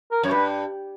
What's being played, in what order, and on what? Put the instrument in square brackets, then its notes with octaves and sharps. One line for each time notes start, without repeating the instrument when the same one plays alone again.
[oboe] A#4
[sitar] F#2 [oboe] C#5
[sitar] G2 [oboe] B4